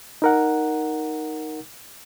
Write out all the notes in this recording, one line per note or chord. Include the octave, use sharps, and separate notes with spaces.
D#4 A#4 F#5